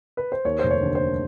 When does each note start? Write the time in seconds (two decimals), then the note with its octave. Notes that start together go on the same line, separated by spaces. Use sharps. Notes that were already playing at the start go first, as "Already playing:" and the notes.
0.17 B4
0.32 C5
0.45 D#2 C#5
0.59 F1 C5
0.71 C#5
0.83 D3
0.95 C5